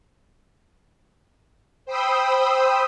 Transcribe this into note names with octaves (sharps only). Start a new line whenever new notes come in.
C5 G5 B5 D#6 E6